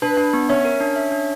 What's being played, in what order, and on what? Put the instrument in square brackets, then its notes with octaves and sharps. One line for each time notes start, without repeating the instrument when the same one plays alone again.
[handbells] D4 [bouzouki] B4
[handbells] D4
B3
[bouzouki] C#4 [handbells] E5
[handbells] A#4
D4
E5
D4